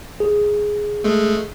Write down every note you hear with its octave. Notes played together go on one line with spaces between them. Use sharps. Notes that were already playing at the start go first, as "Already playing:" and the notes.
G#4
G#3 A3